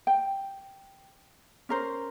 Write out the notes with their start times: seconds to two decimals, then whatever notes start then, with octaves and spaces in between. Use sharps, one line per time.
0.07 G5
1.69 C#4 A#4 C5